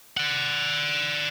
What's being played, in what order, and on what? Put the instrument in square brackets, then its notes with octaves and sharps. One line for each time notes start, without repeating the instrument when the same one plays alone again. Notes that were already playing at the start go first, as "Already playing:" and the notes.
[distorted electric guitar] D5 F#5